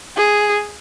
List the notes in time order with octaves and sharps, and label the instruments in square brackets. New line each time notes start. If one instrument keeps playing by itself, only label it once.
[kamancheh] G#4